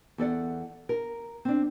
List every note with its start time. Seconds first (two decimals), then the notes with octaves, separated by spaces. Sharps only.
0.18 E2 A4 D5 F#5
0.89 A#4
1.45 C4 D4